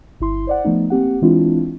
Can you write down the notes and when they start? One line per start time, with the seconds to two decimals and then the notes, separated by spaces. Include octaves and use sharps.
0.20 G1 E4 C6
0.47 C5 D5 F#5
0.64 F3 A3 B3 D#4
0.90 A#3 C4 G4 F#5
1.22 E3 G#3 C4 D4 E4 F4